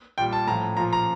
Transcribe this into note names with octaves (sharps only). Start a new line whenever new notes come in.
A#2 G3 G5
A5
A2 F3 A#5
A#2 F3 A#5
A#5